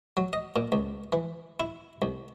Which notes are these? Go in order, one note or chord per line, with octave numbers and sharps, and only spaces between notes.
F#3
D#5
A#2
C#2
E3
E4
C2